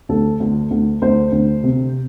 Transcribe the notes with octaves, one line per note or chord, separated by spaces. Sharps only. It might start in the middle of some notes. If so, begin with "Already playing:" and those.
D2 A4
D2
D2
D2 C5
D2
C3